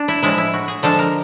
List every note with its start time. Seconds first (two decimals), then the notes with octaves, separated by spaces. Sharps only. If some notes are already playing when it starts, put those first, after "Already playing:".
Already playing: D4
0.08 E4
0.23 A2 F3 G#3 E4
0.38 E4
0.54 F#4
0.68 G#4
0.83 D3 F3 G#3 A4
0.99 A#4